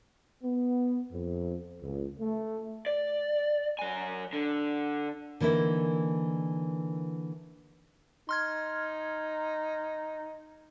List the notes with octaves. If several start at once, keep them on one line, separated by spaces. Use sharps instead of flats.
B3
F2
C#2
A3
D5
F#3 G#5
D3
D3 E3 A#3 D#4 E4
D#4 C6 F6 G#6